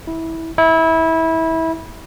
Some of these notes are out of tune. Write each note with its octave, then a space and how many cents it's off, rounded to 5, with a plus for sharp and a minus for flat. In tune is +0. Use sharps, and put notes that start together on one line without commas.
E4 -15
E4 -20